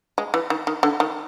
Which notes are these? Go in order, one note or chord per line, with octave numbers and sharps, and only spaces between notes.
G#3
E3
D#3
D#3
D3
D#3